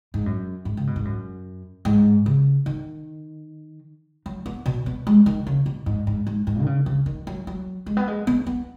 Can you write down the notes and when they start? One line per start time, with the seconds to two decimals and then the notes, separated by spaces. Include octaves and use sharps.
0.14 G#2
0.26 F#2
0.65 G#2
0.77 C#3
0.87 B2
0.96 G#2
1.05 F#2
1.85 G#2
2.26 C#3
2.66 D#3
4.26 F#3
4.46 B3
4.66 B2
4.86 B3
5.07 G#3
5.26 D#3
5.47 C#3
5.66 B2
5.86 G#2
6.07 G#2
6.27 G#2
6.47 G#2
6.61 D#3
6.66 C#3
6.86 C#3
7.06 D#3
7.27 F#3
7.47 F#3
7.86 G#3
7.97 B3
8.08 G#3
8.27 B3
8.47 B3